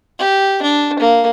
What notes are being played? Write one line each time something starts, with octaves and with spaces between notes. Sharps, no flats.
G4
D4
A#3